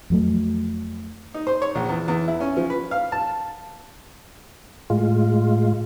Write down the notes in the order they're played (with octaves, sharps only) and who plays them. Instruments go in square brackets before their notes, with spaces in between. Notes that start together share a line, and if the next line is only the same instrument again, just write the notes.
[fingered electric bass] F2 F#3 A3
[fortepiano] D#4
C5
C#5
A#1
E2
E2
E4
C#4
F3
B4
F5
A5
[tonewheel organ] A2 G#3 F4